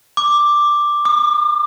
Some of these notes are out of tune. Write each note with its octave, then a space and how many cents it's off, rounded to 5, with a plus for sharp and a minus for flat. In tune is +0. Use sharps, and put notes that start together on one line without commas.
D6 +5
D6 +45